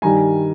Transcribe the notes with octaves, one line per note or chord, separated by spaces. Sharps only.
G2 D#3 G3 G#5 A#5